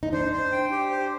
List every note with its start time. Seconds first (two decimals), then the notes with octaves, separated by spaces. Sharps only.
0.03 D#4
0.13 D4 C5
0.32 C5
0.52 G5
0.71 G4
0.91 C5